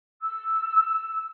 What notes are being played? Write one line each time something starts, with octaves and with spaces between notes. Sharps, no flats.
E6